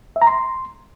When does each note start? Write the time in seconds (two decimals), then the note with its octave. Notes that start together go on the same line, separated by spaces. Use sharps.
0.16 E5
0.22 A#5
0.27 C6